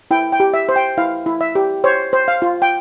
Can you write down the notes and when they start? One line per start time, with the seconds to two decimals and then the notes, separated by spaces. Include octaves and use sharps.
0.11 E4 G5
0.32 G5
0.40 G4
0.54 E5
0.69 C5
0.76 G5
0.98 E4 F5
1.26 E4
1.41 E5
1.55 G4
1.84 C5 C#5
2.13 C5
2.28 F5
2.42 F4
2.62 G5